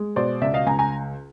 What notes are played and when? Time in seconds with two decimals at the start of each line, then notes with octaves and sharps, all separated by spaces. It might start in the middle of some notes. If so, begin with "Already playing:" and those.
Already playing: G#3
0.16 B2 C5 D5
0.41 C#2 D5 E5
0.54 D#5 F5
0.66 C#2 G#5 A#5
0.79 G#5 A#5